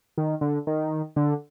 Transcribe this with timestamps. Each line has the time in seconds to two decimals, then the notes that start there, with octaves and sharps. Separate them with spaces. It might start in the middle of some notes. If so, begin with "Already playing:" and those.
0.18 D#3
0.41 D3
0.67 D#3
1.16 D3